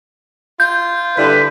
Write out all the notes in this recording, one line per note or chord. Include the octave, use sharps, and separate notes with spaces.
F4 G6
D3 G3 E4 B4